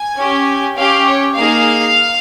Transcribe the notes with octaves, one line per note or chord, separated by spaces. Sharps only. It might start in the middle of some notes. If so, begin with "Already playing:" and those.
Already playing: G#5
C#4 G4
C#4 G4 F5
C#5
A#3 D#4 G#4 F5